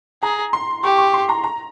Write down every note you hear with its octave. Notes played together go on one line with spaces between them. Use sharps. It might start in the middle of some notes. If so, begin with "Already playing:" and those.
G#4 A#5
C6
G4 C#6
C#6
C6
A#5
A#5